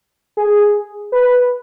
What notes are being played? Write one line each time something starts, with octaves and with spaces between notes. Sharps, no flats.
G#4
B4